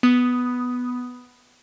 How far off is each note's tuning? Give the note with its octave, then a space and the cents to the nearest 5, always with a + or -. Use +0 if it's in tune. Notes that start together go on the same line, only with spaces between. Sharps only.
B3 +0 D#6 +0